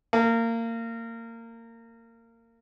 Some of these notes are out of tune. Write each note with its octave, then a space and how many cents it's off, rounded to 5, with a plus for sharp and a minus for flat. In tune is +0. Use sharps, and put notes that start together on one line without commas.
A#3 -25